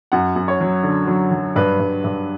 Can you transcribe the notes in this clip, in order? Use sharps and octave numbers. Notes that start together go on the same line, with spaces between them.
F#2 F#5
F#2
C#5
F#3
D3
F#3
F#3
G2 B4
G2
G2